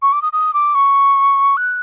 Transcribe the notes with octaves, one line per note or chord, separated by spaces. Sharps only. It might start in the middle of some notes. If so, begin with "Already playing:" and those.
C#6
D6
D#6
D#6
D6
C#6
F#6